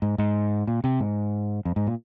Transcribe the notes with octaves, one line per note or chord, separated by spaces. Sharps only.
G#2
G#2
A#2
C3
G#2
F2
G#2
A#2